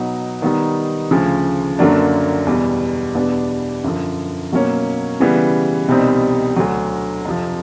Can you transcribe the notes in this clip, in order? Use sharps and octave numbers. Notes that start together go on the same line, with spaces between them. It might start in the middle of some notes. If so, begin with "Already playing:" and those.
Already playing: B2 F#3 B3 D#4 F#4
D#3 G3 B3 D#4
D2 C#3 F3
F#2 D3 F#3 A#3 D4
E2 B2 G3
E2 B2 G3 B3 D4
F#2 D3 F3
B2 F#3 A#3 C#4
C#3 E3 G3 B3
C2 B2 G3 C4 D#4
D2 D3 F#3
F2 C3 F3